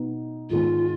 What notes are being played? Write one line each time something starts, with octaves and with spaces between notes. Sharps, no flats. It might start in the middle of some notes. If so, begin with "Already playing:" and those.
Already playing: B2 B3 D#4
G#2 D#3 G#3 B3 F4